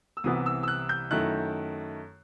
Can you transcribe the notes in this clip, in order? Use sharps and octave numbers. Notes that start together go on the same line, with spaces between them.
E6
C2 C3 E3 B3 D#6
E6
E6
F#6
G6
F#2 D#3 A3 E4 F#6